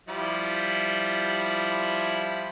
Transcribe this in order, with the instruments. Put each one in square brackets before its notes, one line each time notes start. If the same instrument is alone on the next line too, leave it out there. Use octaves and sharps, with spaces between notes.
[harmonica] F3 G3 E4